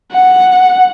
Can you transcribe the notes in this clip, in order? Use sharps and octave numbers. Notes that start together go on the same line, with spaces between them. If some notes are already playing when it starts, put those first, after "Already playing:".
F#5